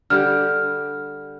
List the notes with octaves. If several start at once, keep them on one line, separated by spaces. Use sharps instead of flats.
D3 G3 G4 F6